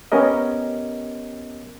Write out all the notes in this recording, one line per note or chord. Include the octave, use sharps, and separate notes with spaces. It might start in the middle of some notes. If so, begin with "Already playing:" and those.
B3 C#4 G4 A#4 D#5